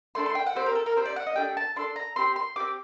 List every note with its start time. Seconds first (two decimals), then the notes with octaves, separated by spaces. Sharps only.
0.15 A3 D4 A4 C6
0.26 C6
0.35 G5
0.46 F#5
0.55 C4 G4 C5
0.66 A#4
0.75 A4
0.86 A#4
0.96 C4 G4 C5
1.05 D5
1.16 F#5
1.27 D#5
1.36 A3 D4 G4 G5
1.57 A5
1.76 D4 A4 C6
1.96 A#5
2.16 C4 G4 C6
2.36 C6
2.56 C4 G4 D6